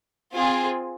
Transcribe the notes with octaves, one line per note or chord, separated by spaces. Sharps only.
C4 F4 G#4